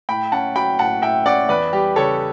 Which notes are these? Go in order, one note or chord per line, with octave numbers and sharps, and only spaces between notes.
A2 G5 B5
C#4 F#5 A5
F#3 G5 B5
A2 F#5 A5
A2 E5 G5
C#4 D5 F#5
E2 B4 D5
G3 G4
C#3 A4 C#5